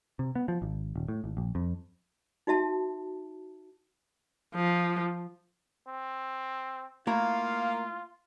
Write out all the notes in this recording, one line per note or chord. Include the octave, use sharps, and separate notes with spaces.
C3
B3
F3
G#1
D#1
A2
G#1
A#1
F2
D#4 F#4 E5 A5
F3
C4
A3 A#3 E4 F4 A#5